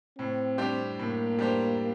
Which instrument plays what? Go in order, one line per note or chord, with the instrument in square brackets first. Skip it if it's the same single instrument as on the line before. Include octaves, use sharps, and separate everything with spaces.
[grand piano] A2 [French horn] C4
[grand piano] G3 D4 G4 C5
[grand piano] A2 [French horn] A#3
[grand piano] G3 D4 G4 C5